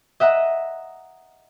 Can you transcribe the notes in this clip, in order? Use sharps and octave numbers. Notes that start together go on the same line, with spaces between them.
D#5 E5 F#5 A#5